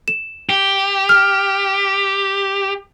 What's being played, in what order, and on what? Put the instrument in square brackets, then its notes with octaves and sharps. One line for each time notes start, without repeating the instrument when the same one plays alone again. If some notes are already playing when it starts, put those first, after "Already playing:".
[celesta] E7
[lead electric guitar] G4
[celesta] F6